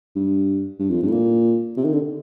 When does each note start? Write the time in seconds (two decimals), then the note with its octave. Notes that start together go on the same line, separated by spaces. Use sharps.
0.16 G2
0.79 G2
0.90 F2
1.02 G2
1.08 A2
1.12 A#2
1.77 C3
1.84 D#3
1.93 D3